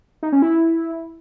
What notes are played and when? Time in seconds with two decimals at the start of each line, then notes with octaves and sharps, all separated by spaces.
0.23 D#4
0.32 C#4
0.42 E4